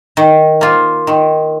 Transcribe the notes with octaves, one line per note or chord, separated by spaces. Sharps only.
D#3
A#3 F4
D#3